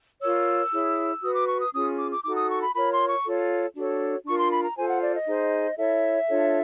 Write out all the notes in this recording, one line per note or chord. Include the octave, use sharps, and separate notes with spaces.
F4 A#4 C#5 E6
E4 G#4 C#5
F#4 B4 D#6
D6
C#6
D#6
C#4 F4 G#4 D#6
D6
D6
D#4 F#4 A4 D6
D#6
C#6
B5
F4 A#4 C#5 B5
C6
C#6
F4 A4 C#5
D4 F#4 A4 C#5
D4 F4 A#4 C#6
C6
B5
A#5
F4 A4 C5 G#5
F#5
D5
D#5
D#4 G#4 C5
E4 A4 C#5 E5
D4 F4 A4 C#5